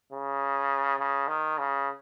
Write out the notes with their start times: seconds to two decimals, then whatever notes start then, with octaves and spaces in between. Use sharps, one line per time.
0.13 C#3
0.99 C#3
1.28 D#3
1.58 C#3